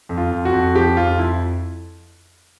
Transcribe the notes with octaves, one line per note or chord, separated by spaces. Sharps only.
F2
F4
F2
F#4
F2
F3 G4
F2 F4
F3 E4